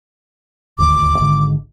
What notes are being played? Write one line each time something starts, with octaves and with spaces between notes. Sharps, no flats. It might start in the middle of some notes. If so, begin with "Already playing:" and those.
D#1 G#1 D2 D6
G#1 G#2 D3